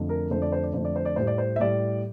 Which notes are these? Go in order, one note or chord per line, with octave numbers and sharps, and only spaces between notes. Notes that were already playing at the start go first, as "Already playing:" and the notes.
Already playing: F2 D3 A3
A#4
F2 D3 A3 C5
D5
C5
D5
F2 D3 A3 C5
D5
C5
D5
A2 G3 C5
D5
C5
E5
A2 G3 D5